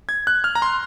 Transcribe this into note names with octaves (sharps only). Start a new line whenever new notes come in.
G#6
F#6
F6
A#5
C6